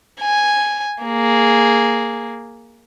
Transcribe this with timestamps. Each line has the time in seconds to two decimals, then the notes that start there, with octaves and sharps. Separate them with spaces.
0.21 G#5
1.04 A#3 G#4